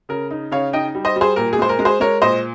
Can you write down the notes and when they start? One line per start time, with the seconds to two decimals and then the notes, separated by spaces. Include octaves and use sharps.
0.09 C#3 A#4
0.31 D#4
0.51 C#3 C#5 F5
0.73 D#4 D#5 G5
0.95 G3
1.05 C5 D#5
1.16 G3
1.21 G#4 C5
1.36 A#2 A#4
1.53 G#4
1.58 G#3 C5
1.69 A#4
1.79 G#3
1.85 G#4 C5
2.00 G#3 A#4 C#5
2.22 A#2 C5 D#5